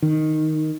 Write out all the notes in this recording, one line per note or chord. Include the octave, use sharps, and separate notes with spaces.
D#3